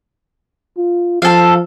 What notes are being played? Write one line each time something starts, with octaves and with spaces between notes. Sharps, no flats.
F4
F3 A4 F5